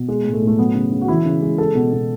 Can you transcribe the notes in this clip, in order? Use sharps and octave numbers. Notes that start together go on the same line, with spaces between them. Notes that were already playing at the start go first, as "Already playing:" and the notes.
Already playing: B2
G#3
A2
A3
A2
A3
F#3 B3
C#3
C#3
F#4
E3 E4
C#3
G#3
G#3 A4
B2
B2